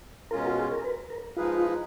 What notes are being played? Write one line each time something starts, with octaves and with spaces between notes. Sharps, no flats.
B2 G#3 C#4 F4 A#4
F#4
G#4
A#4
B4
A#4
F3 G#3 D#4 F4 G#4 B4